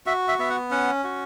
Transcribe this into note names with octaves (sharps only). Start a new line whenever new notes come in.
F#4 E5
E5
B3 E5
F#5
C#4 F#5
F#4